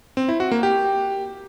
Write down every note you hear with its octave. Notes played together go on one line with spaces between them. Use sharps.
C4
E4
F#4
A#3
G4